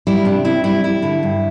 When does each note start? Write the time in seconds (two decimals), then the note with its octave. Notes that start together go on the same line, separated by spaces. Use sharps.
0.07 G3 E4
0.25 C3 D4
0.44 C4 E4
0.64 G3 E4
0.84 G3 E4
1.02 D3
1.23 G2